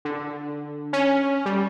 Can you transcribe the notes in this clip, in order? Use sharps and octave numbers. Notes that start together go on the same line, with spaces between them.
D3
C#4
G3